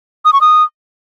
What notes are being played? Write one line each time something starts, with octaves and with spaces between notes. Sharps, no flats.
D#6
C#6
D#6